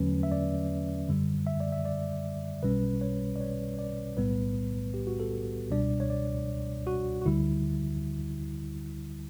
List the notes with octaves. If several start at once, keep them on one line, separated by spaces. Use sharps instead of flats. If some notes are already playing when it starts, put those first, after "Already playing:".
Already playing: E2 D3 F#3 A3 C#4 B4
E5
D5
F#2 D3 G3
E5
D5
E5
D5
B1 B2 G3 C#4 B4
C#5
D5
C#5
D5
B1 A2 G3 B3 B4
G4
F#4
A4
C#2 B2 G3 D4 D5
C#5
D5
F#4
F#4
D2 D3 G3 E4